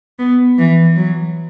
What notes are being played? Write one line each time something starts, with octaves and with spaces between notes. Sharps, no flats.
B3
E3
F#3